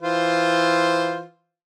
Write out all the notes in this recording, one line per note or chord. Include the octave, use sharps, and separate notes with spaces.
E3 F4 C5